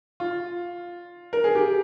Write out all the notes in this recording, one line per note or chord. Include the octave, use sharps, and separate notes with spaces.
F4
A#4
G#4
G4